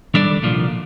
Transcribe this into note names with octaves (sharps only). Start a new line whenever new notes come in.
D#3 G3 D4 A4 D5
C2 A#2 F3